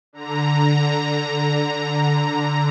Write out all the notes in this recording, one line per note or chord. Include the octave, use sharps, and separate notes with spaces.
D3 A#5